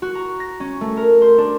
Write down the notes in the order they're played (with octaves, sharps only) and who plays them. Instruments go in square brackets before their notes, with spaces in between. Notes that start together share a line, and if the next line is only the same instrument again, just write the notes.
[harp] F#4
A#5
A#6
C#4
A3
A#4
C5
D4